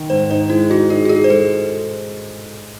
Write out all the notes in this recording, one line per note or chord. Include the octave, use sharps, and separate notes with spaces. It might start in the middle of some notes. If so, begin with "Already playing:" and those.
Already playing: D#3
G#2 C5
D#4 C5
G#3 E4
D#4 F#4
D#4 G#4
F#4
D#4 G#4
C5
G#3 A4